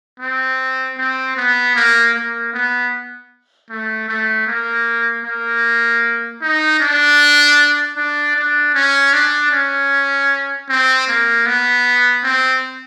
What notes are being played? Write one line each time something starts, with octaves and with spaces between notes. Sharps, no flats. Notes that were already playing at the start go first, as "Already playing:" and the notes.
C4
C4
B3
A#3
A#3
B3
A3
A3
A#3
A#3
D#4
D4
D4
D4
C#4
D4
C#4
C4
A#3
B3
C4